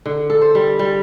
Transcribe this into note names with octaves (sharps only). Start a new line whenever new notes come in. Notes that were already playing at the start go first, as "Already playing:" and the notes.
D3
A4
C5
G3
G3